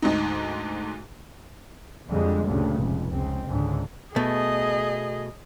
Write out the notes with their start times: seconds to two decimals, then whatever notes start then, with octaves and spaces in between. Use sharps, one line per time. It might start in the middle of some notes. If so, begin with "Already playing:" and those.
0.02 D2 G#2 D#4
2.09 F2 D3 G3 G#3
2.47 D2 G2 A#2 C#3
2.78 F1 C#2
3.12 C#2 C4
3.46 C#2 G#2 D3
4.16 B2 A3 G#4 D#5